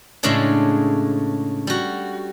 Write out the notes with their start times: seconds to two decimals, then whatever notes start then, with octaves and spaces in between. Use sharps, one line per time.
0.23 A2 C#3 G#3 A3 D4 G#4
1.67 G3 F#4